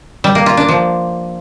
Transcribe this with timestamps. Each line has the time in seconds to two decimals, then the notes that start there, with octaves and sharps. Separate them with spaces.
0.24 G3
0.35 A#3
0.46 F4
0.57 D4
0.68 F3